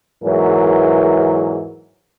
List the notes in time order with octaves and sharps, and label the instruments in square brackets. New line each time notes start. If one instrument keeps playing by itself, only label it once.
[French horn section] E2 G#2 E3 F#3 A#4